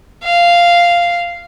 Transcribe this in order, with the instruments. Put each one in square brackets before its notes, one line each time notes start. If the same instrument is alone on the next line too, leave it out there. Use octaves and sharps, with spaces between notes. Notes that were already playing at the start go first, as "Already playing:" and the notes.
[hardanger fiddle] F5